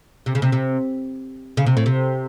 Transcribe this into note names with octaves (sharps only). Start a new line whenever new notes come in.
C3
C#3
C3
C3
C#3
C3
A2
C3